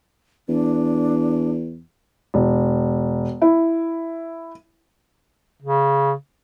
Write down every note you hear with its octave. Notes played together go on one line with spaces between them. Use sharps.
E2 D4
E1
E4
C#3